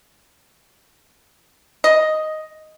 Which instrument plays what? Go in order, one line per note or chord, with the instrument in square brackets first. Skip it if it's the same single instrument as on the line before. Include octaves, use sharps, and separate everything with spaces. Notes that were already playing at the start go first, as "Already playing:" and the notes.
[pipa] D#5